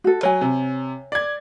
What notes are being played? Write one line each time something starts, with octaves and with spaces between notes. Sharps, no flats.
F#4 A4
F#3 C#5 G#5
C3
D5 G#6